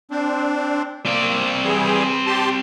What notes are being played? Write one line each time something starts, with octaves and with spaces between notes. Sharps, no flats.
C4 D4
A#3 C4 D5
E3 G3 G#4
G4 A5 C6